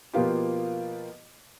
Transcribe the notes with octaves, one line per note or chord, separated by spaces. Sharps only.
B2 F3 A#3 B3 F4 G4